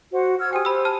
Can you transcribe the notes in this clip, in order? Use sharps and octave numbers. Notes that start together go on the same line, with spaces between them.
F#4 C5 F#5
E6 F6 G#6
G4 C5 G5 G#5 D#6
G4 C5 B5 E6
A5 F6